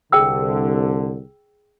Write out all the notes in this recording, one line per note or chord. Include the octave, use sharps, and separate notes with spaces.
C2 D3 G#4 G5 E6